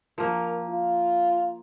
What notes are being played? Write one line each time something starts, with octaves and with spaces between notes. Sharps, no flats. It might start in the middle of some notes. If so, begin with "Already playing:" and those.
F3 A#3 A#4
F4